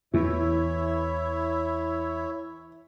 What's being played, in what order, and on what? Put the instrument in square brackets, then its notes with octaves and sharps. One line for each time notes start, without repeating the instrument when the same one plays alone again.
[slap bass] E2 [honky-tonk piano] E3 [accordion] E4 C#5 E5